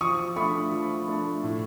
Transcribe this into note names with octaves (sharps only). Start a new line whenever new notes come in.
F3 C#6 D#6
A3 D4 B5 C#6
F3
A3 D4
A2